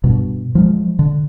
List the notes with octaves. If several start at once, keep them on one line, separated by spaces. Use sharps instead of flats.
G2 B2
F3 F#3 G#3
D3